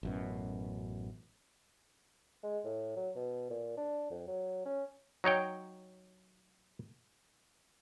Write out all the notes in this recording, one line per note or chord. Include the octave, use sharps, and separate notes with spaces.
A1 F#2 B2
G#3
A2
F#3
B2
A#2
D4
F2
F#3
C#4
F#3 D#4 C#5 G5